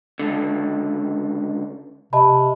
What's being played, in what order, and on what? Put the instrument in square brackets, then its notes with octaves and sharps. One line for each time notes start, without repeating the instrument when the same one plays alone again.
[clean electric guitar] C#2 D3
[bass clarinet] C3 [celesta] D#5 A5 B5